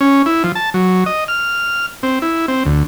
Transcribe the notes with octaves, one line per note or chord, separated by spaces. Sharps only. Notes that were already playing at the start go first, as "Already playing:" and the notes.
C#4
E4
F3
A5
F#3
D#5
F6
C4
E4
C4
D2